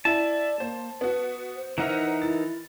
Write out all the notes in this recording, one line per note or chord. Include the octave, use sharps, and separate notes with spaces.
E4 D5 A5
A#3 C5
B3 F#4 B4
C5
E3 D#4 A#4 E5 F#5 A#5
E4 A6